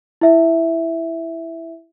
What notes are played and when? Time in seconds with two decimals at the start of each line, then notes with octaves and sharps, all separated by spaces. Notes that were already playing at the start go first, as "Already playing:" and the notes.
0.21 E4 E5